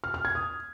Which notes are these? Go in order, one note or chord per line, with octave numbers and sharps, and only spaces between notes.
F6
F6
G#6
D#6